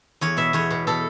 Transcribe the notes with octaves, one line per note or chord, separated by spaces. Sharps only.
E2 C#5
B2 E5
E2 C#5
B2
B2 A4